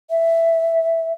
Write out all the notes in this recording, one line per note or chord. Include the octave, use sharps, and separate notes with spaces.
E5